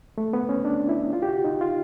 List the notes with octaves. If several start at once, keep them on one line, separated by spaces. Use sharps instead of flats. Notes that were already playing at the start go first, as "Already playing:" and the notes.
A3
B3
C#4
D4
E4
F4
G4
F#4
D#4
F4